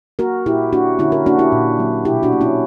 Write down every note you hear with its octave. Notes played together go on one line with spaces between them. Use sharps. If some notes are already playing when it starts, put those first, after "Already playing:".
A#3 F#4 A#4
A#2 E4 G4
A#3 D4 F#4
D3 C#4 E4
F#4 A#4
A#3 D4 F#4
E4 G4
A#2
F#3 A#3
B2 E4 G4
D4 F#4
A#3
C#4 E4